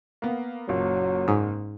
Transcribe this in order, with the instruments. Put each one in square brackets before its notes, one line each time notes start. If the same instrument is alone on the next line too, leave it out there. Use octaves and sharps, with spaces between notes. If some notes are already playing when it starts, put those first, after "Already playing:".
[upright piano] A#3 B3
[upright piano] F#1 A#2 [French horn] F#3
[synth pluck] G#2